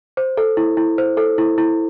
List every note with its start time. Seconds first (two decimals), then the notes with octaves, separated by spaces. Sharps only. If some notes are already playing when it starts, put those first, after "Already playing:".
0.17 C5
0.37 A4
0.57 E4
0.77 E4
0.98 C5
1.17 A4
1.38 E4
1.58 E4